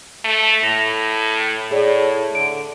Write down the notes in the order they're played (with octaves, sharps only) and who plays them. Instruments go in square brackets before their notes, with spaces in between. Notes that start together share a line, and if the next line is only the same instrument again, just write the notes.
[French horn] A3
[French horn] A2 [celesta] A#6 F7
[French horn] A2 [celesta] G#4 C#5 D5
[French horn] D3 [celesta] D7